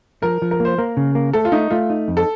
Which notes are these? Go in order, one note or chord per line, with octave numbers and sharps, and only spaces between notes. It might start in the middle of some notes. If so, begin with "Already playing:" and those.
F3 A#4
F3
A#4
A#3 C5
A#3 A#4
C#3
A#3
A3 A4
F4
A3 D#4
A3 F4
D#4
F2
A4